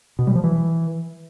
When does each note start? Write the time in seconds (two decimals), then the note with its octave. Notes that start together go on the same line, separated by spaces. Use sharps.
0.19 B2
0.27 G3
0.35 F3
0.44 E3